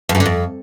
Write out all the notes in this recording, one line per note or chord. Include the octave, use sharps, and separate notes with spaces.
F2
F#2
D3
F2